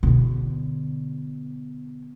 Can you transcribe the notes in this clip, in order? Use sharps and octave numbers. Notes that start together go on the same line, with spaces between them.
B2 D3